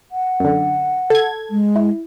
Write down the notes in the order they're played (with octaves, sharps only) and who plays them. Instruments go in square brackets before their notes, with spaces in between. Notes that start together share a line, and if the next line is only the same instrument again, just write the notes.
[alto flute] F#5
[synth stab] F#2 D3
A4 G#6
[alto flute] G#3
[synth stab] E4